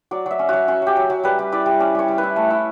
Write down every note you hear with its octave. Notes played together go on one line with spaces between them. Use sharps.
F#3 D5
F#3 E5
C#4
F#3 F#4
C#4 F#4
F#3 G4
F#3
F#3
G3 B4
G3
E4 D5
G3
C#4 D5
G3 C#5
G3
B4
E4
A3
E4